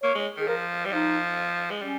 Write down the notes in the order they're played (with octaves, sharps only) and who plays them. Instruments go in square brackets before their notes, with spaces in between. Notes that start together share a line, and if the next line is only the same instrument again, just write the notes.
[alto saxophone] A#3 [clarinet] C#5
[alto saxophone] G#3
[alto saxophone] D#3 [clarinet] G#4
[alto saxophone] F3 [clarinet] A#4
[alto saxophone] G3
[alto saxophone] F3 [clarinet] D#4
[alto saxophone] G#3
[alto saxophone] G3 [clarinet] C#4